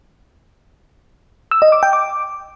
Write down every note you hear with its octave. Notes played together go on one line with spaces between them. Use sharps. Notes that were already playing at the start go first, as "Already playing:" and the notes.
E6
D#5
D6
G5
D6